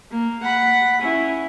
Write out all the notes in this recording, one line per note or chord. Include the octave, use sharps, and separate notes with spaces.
A#3
F#5 B5
C#4 E4